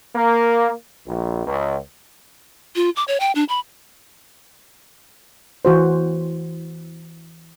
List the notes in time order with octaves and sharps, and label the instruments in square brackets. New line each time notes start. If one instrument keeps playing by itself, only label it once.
[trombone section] A#3
A#1
C#2
[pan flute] F4
D6
C#5
G5
D4
B5
[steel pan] E3 F#4 C5